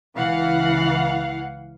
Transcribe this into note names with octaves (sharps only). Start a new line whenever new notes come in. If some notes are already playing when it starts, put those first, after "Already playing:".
C#2 E3 F5 F#5